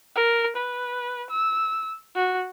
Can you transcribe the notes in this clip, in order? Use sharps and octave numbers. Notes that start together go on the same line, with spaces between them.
A#4
B4
E6
F#4